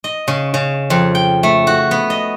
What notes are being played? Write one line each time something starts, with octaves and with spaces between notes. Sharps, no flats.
D#5
C#3
C#3
F2
G5
A3
F#4
B3
D#5